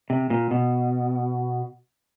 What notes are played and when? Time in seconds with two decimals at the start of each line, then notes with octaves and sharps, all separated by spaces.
0.10 C3
0.30 A#2
0.51 B2